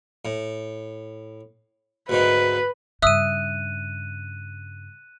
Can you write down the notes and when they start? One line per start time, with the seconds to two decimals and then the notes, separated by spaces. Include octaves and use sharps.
0.25 A2
2.09 D2 G#2 D#3 B4
3.02 G2 C#3 E5 D#6 E6 F#6 D#7